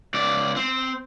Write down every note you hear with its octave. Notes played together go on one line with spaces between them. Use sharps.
C#2 D5
C4